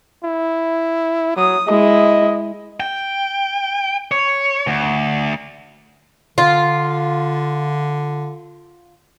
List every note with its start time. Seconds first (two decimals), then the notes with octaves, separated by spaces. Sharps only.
0.24 E4
1.37 F#3 D#6
1.68 G#3 E4 D#5
2.80 G5
4.11 C#5
4.67 D2
6.38 D3 F4